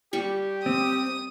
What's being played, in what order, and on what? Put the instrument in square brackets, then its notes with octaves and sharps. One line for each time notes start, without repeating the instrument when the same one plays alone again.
[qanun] G3 C#6 [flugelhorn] G4
[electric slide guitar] C4 [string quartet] D#6